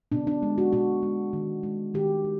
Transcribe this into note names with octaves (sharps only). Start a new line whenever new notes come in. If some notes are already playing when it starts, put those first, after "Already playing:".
B2 D4
D4
G#3
F#4
B2 F#4
G#3
D#3
G#3
D#3 G4
G#3